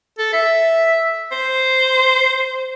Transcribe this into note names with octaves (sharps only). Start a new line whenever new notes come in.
A4
E5
C5